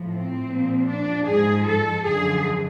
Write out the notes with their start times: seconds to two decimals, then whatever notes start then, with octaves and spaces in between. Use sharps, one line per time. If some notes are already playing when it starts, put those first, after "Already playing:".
Already playing: A2 F3
0.11 C4
0.50 A#2 F3
0.89 D4
1.27 G#2 F3 G#4
1.66 A4
2.04 F#2 D3 F3 G#4